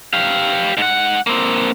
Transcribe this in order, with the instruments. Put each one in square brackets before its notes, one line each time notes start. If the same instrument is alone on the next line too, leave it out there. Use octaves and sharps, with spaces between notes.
[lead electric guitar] G4 F5
G#2 F#5
A#3 C4